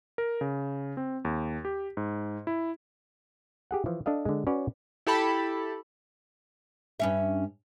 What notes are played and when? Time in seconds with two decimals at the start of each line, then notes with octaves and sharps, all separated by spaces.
0.18 A#4
0.41 C#3
0.97 C4
1.25 D#2
1.65 G4
1.97 G#2
2.47 E4
3.71 G4 G#4 F#5
3.86 E3 F3
4.06 D4 A4 D#5 F5
4.25 D3 G#3
4.47 C#4 F#4 B4 C#5 D5
5.07 E4 G4 A4 A5 B5
7.00 G2 C#4 E5